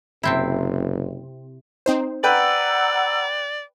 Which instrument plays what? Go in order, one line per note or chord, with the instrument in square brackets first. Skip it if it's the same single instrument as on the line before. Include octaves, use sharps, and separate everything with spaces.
[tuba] F#1 [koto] C3 C4 E4
[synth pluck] C4 D#4 C5
[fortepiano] B4 G5 [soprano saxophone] D5 [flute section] F#5 A#5 E6